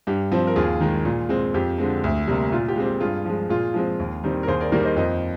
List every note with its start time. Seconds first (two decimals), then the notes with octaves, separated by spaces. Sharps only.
0.07 G2 G4
0.32 F3 C4
0.47 A#4
0.56 D#2 F4 G#4
0.81 D#3 G#3
1.05 A#2
1.29 G#3 C4
1.54 F2 G4
1.78 D3 G#3 C4
2.04 D2
2.27 C3 G3 A#3
2.52 A#2 F4
2.68 G4
2.76 G#3 C4
2.85 G4
3.00 G2 F4 G#4
3.25 F3 G#3
3.49 A#2 F4 G#4
3.74 F3 G#3 C4
4.00 D#2
4.24 D#3 G3 C4
4.43 A#4
4.47 D#2 G#4 C5
4.60 A#4 D5
4.72 D#3 G3 A#3 A#4 D5
4.85 C5 D#5
4.97 F2 C5 D#5